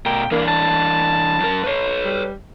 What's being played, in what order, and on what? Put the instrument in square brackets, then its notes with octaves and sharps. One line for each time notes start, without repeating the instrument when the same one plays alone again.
[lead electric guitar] B2 A#4 [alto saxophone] G5
[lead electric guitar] E3 D4 [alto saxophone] A#3
[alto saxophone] A5
[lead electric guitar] F#2 A#4
B4 C#5
[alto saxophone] G3